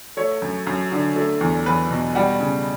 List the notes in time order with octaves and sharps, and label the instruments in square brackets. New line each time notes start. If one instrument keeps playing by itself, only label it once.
[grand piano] A3 C#5
F#2
F#2
D3
A3
E2
E2 B4
B2
G3 F#5
C#3